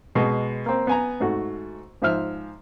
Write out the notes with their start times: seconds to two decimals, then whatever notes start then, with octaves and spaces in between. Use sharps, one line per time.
0.15 B2 G#3
0.66 A#3 C4
0.87 B3 G#5 A#5
1.20 G#2 A3 F#4
2.02 G#2 F3 C5 E5 F6